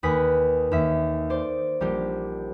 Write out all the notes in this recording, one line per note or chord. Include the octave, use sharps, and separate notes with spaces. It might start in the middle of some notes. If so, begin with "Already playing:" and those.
D#2 B4 G#5 D#6 B6
D#2 E5
C5 D5
A#1 G3 G4